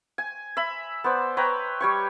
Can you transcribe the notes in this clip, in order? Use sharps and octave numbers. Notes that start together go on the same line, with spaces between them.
G#5
E5 B5
B3 C5 D5
B4 C#5 G5 A#5
G3 C#5 C#6